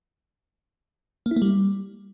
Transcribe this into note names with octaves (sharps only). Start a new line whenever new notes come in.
A#3
E4
A#3
G3